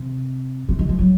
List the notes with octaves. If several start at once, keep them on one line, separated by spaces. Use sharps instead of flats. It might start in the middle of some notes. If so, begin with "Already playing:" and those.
Already playing: C3
C3
D#3
F3
F#3